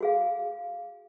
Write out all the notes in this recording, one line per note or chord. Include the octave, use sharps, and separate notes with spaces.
F#4 G#4 F5